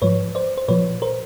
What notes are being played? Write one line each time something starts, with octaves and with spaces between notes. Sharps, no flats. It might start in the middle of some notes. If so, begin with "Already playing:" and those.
G#2 F3 B4 C#5
C5 D5
C5
A#2 F3 B4 C#5
A#4 C5